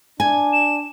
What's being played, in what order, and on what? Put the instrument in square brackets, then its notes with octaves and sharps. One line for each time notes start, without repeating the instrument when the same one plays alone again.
[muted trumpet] D4 [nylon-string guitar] G#5
[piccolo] E7